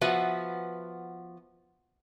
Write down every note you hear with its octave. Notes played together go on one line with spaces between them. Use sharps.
F3 B3 F#4 B4 E5 F#5